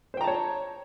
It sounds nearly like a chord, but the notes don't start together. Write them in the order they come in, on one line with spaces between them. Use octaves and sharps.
C5 G5 A#5 A5 C#5